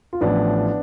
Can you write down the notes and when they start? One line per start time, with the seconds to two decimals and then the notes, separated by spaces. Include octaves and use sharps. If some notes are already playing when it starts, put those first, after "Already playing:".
0.13 F4
0.21 A1 A2 F3 B3 D4